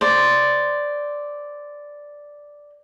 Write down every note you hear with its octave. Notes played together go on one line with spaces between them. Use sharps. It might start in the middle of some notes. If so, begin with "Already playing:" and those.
C5 D5